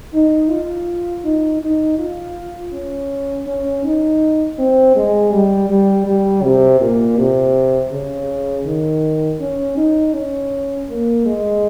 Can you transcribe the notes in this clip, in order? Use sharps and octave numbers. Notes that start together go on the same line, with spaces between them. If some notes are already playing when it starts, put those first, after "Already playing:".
D#4
F4
D#4
D#4
F4
C#4
C#4
D#4
C4
G#3
G3
G3
G3
C3
A#2
C3
C#3
D#3
C#4
D#4
C#4
A#3
G#3